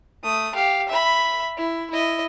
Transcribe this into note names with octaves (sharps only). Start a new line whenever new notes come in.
A3 D#6
G4 F5
E5 B5
E4
E4 D#5